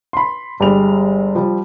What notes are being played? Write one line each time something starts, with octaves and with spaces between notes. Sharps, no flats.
B5 C6
G1 G3 G#3 F7
F3 G3